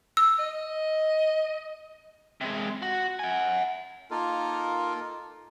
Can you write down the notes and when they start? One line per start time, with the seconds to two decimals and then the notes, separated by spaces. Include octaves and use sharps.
0.17 E6
0.39 D#5
2.41 C3 G#3
2.82 F#4
3.19 F#5 G#5
4.11 A#3 D#4 F4 A4 A#4